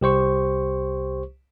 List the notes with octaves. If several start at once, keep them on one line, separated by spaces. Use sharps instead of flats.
C2 G4 C5 C#6